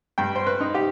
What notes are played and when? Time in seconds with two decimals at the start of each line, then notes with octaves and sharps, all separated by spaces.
0.18 G2 G5
0.35 C5
0.47 B4
0.61 D#4
0.74 G4